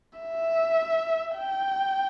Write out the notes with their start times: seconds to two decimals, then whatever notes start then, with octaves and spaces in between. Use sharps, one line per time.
0.19 E5
1.36 G5